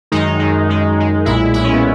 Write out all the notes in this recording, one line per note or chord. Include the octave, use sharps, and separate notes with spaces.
F#2 D#3 G#3 D#4
F#2 D#3 G#3
F#2 D#3 G#3
F#2 D#3 G#3
B1 A#2 G#3 E4
B1 A#2 G#3 E4
C#4
B3